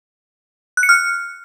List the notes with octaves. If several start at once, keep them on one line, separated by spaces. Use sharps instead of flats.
F#6
C#7
F6